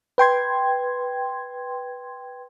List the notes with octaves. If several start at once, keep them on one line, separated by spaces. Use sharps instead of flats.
B4 G5 C6 G#6